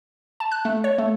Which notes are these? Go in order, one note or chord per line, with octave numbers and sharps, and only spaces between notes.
A5
F#6
A3
C#5
A3